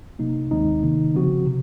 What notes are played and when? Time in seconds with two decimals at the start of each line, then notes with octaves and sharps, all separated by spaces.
0.19 C3 F#3 A#3 D#4
0.51 D#2 D#3 G#3 C4 D#4
0.83 C3 D#3 A#3 D#4
1.15 C#3 F3 C4 F#4
1.46 C3